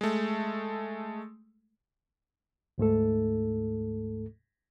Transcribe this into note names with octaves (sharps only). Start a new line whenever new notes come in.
G#3 A3
D2 G#2 A3 A4